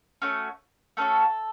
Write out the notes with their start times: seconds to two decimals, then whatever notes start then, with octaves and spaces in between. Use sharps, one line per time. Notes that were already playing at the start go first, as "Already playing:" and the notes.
0.22 A3 C#4 F#4
0.97 A3 C#4 F#4 A4